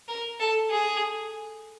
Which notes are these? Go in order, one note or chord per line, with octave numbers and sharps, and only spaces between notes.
A#4
A4
G#4